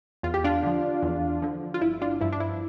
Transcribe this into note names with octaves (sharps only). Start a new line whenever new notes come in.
E2 F4
G4
D4 F4
D3 F3
E2
D3 F3
F4
G1 E4
D4 F4
G2 F3 E4
D4
E4